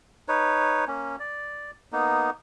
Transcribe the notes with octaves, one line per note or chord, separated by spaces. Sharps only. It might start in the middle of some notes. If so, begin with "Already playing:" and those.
D#4 B4 C#5
A#3 C#4
D5
A#3 B3 D#4